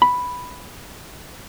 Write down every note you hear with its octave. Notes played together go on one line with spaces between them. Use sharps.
B5